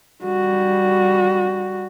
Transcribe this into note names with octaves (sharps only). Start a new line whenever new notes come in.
G3 F#4